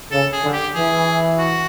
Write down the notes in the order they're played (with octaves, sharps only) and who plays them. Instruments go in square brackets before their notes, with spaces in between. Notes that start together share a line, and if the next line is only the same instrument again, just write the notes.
[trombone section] C#3 [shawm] A4
[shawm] G#4
[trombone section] D3
[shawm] G4
[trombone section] E3 [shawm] G#4
[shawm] F#4